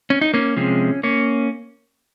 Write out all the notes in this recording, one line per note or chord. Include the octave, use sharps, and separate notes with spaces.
C#4
D#4
A#3 C#4
C3 F3 G#3
A#3 C#4